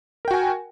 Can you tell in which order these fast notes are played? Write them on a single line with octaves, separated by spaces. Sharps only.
A#4 G5 F#4 G#5